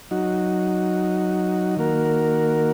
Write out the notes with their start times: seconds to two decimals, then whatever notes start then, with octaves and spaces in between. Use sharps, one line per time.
0.11 F#3 D#4 F#4
1.76 D#3 A#3 F#4 A#4